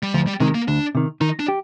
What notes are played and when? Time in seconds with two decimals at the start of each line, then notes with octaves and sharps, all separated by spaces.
0.03 G3
0.14 D2 F3
0.27 G3
0.40 C3 D#3 G#3
0.55 A#3
0.68 D2 D4
0.95 C3 D#3
1.21 D#3 D#4
1.40 D4
1.48 G4